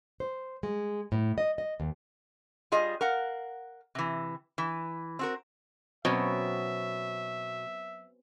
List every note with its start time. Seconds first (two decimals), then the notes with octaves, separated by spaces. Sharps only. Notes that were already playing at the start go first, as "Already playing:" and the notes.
0.20 C5
0.63 G#3
1.12 A2
1.38 D#5
1.58 D#5
1.80 D#2
2.72 G3 F4 G#4 D#5
3.01 A#4 F5 F#5
3.95 C3 E3
4.58 E3
5.19 C4 F#4 A#4
6.05 B2 F#3 C4 C#4 E5